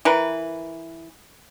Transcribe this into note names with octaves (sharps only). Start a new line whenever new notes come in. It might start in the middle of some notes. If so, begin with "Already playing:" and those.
E3 A#4 B4